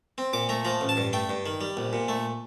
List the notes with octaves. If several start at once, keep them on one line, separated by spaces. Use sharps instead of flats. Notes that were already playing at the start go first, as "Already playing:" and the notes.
C4
A#2 D6
A3 A#5
F3 A#5
A1
A5
G2
A3 G5
G2
D#3
G3
A#1
A#2
A3